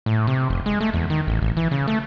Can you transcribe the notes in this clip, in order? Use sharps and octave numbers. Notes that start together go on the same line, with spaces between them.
A2
C3
F1
G#3
A3
E2
D#3
A1
A1
E3
C#3
A3